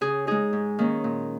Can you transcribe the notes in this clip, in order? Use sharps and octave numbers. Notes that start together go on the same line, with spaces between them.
C#3 G#4
G#3 D#4 G#4
G#2
D#3 A#3 C#4
A#2